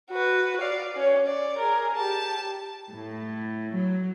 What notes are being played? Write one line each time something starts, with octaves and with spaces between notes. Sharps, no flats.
F#4 B4
D5 F5
C#4 C#5
D5
G#4 A#4
G4 A5
A2
F#3